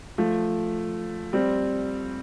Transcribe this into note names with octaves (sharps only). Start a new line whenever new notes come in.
F3 A3
G3 C4